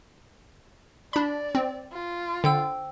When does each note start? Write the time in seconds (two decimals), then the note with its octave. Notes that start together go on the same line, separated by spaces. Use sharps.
1.13 D4 D5 B5
1.55 C4
1.93 F4
2.44 D3 C5 G5 E6